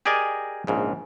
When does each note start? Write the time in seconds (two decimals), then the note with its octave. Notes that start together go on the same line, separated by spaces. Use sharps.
0.05 G4 G#4 A#4 D5 D#5 G#5
0.67 A#1 G#2 C#3